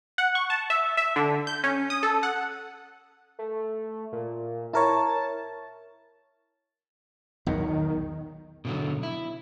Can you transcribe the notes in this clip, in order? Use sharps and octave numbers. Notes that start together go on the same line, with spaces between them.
F#5
C#6
A5
E5
E5
D3
G6
C#4
D#6
A4
F#5
A3
A#2
E4 A#4 C#5 A5
B1 E2 A#2 D#3
B2 D3 F#3
E4